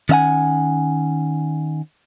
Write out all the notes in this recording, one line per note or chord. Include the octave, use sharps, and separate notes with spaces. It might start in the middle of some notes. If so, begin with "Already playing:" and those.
D#3 C#4 E5 F#5 G#5